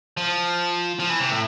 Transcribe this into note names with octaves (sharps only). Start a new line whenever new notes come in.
F3
F3
E3
C3
A2